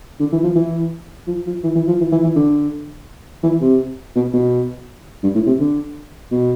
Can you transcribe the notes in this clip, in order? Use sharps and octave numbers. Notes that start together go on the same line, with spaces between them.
D3
E3
F3
E3
F3
F3
E3
E3
F3
E3
E3
E3
D3
E3
C3
B2
B2
G2
A2
C3
D3
B2